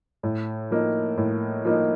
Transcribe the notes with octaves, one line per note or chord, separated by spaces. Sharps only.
A2
F3 A#3 D#4
A2
F3 A#3 D#4